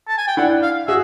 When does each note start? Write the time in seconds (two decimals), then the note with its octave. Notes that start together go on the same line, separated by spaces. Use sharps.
0.08 A5
0.18 G#5
0.28 G5
0.37 D4 E4 F#5
0.63 F5
0.88 F#4 G#4 E5